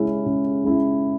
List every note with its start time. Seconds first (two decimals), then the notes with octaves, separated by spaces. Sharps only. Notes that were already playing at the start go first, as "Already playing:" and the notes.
Already playing: C#3 G#3 C#4 E4
0.26 C#3
0.64 G#3 C#4 E4